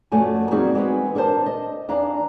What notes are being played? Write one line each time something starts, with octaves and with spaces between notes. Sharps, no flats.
F#2 F3 A3 F#4 D5 G#5
G3 A#3 C4 D#4 F#4 G#4
E3 G#3 B3 C4 F#4
D4 A4 A#4 C5 A5
D#5
E2 D4 F5 A#5